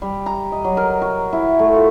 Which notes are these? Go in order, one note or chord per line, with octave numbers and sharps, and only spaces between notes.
G3
A#5
D#5
F#3
A#4
F#4
E4
A3
F4